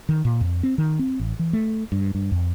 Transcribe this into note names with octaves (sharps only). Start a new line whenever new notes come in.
D#3
A#2
F2
C4
D#3
C4
A1
E3
A3
G2
G2
F2